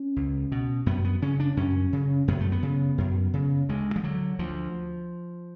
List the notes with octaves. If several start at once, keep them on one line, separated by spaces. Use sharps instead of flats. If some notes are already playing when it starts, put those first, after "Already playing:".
Already playing: C#4
C#2
B2
F#2 B3
B3
C#3 C#4
D4
F#2 C#4
C#3
F#2 B3
A3
B3
C#3
F#2
C#3
D2 G#3
F3
D3 F#3
D2 F3